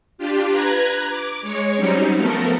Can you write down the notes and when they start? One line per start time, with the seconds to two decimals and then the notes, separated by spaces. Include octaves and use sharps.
0.18 D4 F4 G4
0.50 B4 A#5 F#6 G#6
1.09 D6
1.41 G#3 C#5 C#7
1.77 F#3 G3 C4 C#4 D#4
2.15 F3 A3 B3 A4 A#4